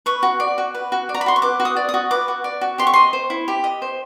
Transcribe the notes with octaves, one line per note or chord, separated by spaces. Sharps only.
B4 C#6
F#4
D5
F#4
B4
F#4
D5
A#5
B5
F#4 C6
C#6
B4 D6
F#4
D#6
D5
D#6
F#4
B4 D6
F#4
D5
F#4
G4 C6
C#6
D#5 C6
C5
E4
G4
D#5
C5